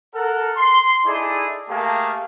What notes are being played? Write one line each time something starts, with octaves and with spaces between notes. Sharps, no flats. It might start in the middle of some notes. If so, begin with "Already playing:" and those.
A4 A#4 F#5
C6
D#4 E4 G#4 A4 D5
A3 A#3 G4 G#4 F5 A5